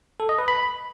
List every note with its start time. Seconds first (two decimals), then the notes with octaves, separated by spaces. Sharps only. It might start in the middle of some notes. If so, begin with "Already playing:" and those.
0.20 A4
0.29 D#5
0.39 B4
0.48 B5